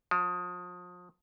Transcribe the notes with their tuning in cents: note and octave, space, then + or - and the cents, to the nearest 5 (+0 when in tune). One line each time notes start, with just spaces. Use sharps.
F3 +35